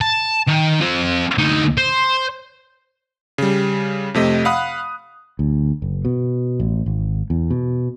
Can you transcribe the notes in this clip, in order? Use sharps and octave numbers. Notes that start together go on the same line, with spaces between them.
A5
D#3
C4 F4
D2 D#4
C5
C#3 G3
F2 C3 A3 D#5
F5 F#5 B5 D#6 F#6
D2
F#1
B2
A1
G#1
E2
B2